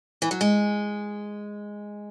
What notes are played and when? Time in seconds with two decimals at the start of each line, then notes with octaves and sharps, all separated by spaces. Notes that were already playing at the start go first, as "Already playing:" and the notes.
0.22 E3
0.31 F#3
0.41 G#3